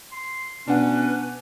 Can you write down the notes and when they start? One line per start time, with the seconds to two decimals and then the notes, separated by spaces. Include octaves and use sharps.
0.12 C6
0.68 B2 C#4 D4 B4 F#5